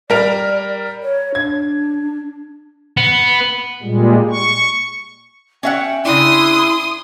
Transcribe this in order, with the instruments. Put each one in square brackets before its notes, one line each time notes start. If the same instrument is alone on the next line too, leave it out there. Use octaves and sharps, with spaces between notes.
[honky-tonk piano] G3 A#4 F7 [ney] D5
[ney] C#5
[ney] D4 [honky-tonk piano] G#6
[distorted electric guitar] B3
[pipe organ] A#2 G3 G#3
C#6
[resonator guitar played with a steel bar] C#4 E5 F#5 [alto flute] G5
[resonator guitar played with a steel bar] C#3 D4 [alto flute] E4 [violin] C6 D#6